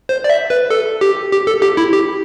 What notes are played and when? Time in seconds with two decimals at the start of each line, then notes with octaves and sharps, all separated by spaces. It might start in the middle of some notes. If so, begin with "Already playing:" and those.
0.09 C5
0.24 D5
0.30 E5
0.50 B4
0.70 A4
1.01 G4
1.32 G4
1.47 A4
1.62 G4
1.77 E4
1.93 G4